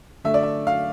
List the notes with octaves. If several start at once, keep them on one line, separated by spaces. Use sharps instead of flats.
D3 A3 E5
D5
E5
F5